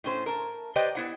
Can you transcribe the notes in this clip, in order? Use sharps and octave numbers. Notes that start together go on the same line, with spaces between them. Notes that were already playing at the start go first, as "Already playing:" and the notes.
A2 C#4 C5
A#4 A5
G4 B4 C5 D5 D#5 G5
B3 E4 F#5